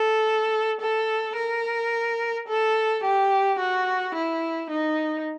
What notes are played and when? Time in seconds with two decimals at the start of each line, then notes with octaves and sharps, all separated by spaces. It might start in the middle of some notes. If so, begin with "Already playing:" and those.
Already playing: A4
0.81 A4
1.37 A#4
2.48 A4
3.04 G4
3.60 F#4
4.15 E4
4.71 D#4